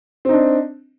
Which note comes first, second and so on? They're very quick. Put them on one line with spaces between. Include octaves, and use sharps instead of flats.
C4 D#4 D4